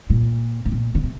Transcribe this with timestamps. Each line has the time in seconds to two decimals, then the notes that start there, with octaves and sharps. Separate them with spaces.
0.10 A#2
0.65 A2
0.72 A#2
0.95 D3
1.03 C3